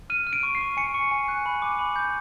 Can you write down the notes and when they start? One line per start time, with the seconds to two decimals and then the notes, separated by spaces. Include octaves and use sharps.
0.10 F6 D#7
0.27 F6
0.33 D7
0.43 C#6
0.55 C7
0.61 C#6
0.77 G#5 C#7
0.94 C#6
1.11 G#5
1.28 F#6
1.46 B5
1.62 D6
1.79 B5
1.96 G6